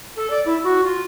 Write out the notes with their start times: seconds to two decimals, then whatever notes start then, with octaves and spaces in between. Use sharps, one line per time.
0.16 A4
0.30 D5
0.45 E4
0.63 F#4
0.83 F4